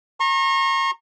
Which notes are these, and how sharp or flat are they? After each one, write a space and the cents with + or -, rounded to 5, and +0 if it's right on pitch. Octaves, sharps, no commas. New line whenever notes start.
A#5 -10 C#6 -45